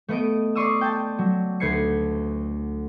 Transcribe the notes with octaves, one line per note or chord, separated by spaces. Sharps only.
A3 B3 D#5 D7
D5 C6 C#6 D#6 E6
G5 A5
F#3
D2 A3 B4 G#6 C7 C#7